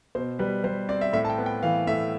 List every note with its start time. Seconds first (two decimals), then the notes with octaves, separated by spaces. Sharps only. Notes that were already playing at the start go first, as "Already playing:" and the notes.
0.15 B2 C5
0.39 G3 B4
0.64 G3 C5
0.89 C4 D5
1.01 E5
1.13 A2 E5
1.25 A5
1.30 G5
1.38 B3
1.46 G5
1.63 E3 F5
1.87 A2 E5